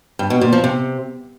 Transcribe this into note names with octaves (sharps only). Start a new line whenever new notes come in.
G2
B2
A#2
F3
C3